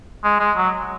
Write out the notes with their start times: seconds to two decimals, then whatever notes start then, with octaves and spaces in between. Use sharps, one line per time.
0.24 G#3
0.40 G#3
0.57 F#3